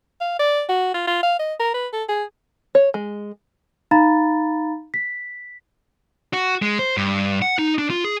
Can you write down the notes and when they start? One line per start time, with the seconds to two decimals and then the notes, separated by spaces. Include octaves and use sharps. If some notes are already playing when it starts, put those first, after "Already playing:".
0.21 F5
0.39 D5
0.69 F#4
0.94 F4
1.07 F4
1.23 F5
1.39 D#5
1.60 A#4
1.74 B4
1.93 A4
2.09 G#4
2.75 C#5
2.94 G#3
3.91 D#4 F5 A#5 B5 A6
4.94 B6
6.33 F#4
6.62 G#3
6.79 C5
6.97 G2
7.42 F#5
7.59 D#4
7.78 D4
7.90 F4
8.05 G#4